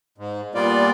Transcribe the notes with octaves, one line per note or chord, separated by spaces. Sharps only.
G#2
A#2 G3 A#3 B3 F4 D5